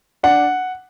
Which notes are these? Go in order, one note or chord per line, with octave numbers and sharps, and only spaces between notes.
D4 F#5